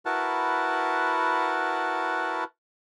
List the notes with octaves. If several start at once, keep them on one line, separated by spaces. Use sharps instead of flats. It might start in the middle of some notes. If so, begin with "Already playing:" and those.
E4 F#4 A#4 B4 F#5 A5